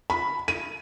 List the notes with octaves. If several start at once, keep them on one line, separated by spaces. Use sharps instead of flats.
B5
D#7